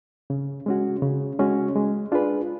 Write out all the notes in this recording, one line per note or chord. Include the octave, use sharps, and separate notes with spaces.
C#3
G#3 C#4 F#4
C#3
G#3 C#4 F#4
G#3
D4 F4 G#4 B4